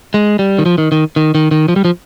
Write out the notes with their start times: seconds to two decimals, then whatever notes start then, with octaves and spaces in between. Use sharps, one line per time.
0.14 G#3
0.39 G3
0.59 D#3
0.66 F3
0.78 D#3
0.92 D#3
1.16 D#3
1.35 D#3
1.51 D#3
1.68 F3
1.76 G3
1.85 F3